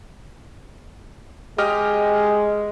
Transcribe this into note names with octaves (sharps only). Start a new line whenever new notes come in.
G#3 G4 D#5 F6